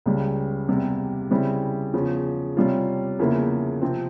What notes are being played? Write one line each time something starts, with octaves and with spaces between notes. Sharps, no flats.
C#2 C#3 G3
E2 C3 G3
C#3 G3 C4 E4
E2 C#3 F3
C3 G3 C#4 F4
E2 C#3 F3 A#3 E4
C3 F3 C4